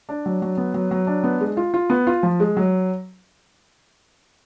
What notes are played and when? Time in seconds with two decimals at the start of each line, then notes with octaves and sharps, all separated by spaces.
0.09 D4
0.26 F#3
0.42 F#3
0.57 B3
0.74 F#3
0.91 F#3
1.07 D4
1.24 B3
1.40 G#3
1.57 F4
1.74 F4
1.90 B3
2.07 F4
2.23 F3
2.40 G#3
2.57 F#3